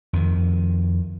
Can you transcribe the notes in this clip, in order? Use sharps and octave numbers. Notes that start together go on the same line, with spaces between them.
F2 D#3